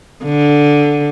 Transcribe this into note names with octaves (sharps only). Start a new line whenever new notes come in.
D3